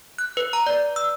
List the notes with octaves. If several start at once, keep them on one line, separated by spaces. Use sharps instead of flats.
F#6
B4
A#5
D5
E6